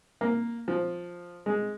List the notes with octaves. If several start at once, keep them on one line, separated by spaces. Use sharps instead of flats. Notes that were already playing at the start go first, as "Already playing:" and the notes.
A#3
F3
G#3